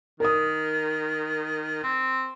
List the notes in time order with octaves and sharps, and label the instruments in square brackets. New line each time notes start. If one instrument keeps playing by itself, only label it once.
[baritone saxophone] D#3 [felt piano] A#4 D#6
[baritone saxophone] C4